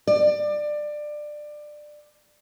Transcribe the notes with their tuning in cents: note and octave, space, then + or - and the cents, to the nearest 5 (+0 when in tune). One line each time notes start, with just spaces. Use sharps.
D5 +20